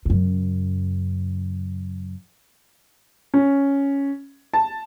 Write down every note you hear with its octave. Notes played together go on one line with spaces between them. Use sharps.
F#2 C#3
C#4
A5